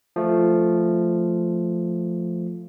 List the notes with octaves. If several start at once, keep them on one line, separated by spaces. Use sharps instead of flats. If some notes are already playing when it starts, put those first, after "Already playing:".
F3 A3